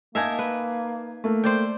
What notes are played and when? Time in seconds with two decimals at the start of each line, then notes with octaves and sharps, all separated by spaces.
0.15 A#3 D#4 A#4 E5 G#5 A5 G#6
0.39 B4
1.24 A3 A#3
1.44 C5 D5 G5